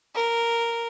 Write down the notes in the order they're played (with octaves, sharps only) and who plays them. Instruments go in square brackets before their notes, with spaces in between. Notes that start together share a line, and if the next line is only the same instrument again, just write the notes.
[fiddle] A#4